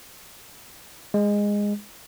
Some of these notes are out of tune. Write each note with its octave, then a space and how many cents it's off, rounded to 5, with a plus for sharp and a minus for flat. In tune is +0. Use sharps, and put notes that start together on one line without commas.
G#3 -15